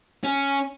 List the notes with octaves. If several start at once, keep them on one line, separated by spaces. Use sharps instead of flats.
C#4